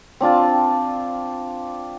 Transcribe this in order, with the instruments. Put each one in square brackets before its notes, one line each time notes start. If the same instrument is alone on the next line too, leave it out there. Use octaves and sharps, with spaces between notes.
[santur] C4 D4 F4 A5